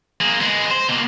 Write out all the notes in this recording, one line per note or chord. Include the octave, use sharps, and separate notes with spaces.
A#3 G#4
G#3 B3
C5
B2 A#3